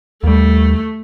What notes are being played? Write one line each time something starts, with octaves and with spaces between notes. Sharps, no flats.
D#2 G3 A3